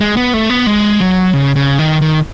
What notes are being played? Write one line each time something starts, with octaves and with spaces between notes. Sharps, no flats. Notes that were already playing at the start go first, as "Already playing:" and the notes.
G#3
B3
A3
B3
G#3
F#3
C#3
C#3
D#3
D#3